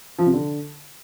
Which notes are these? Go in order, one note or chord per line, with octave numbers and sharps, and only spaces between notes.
F3
C3
D3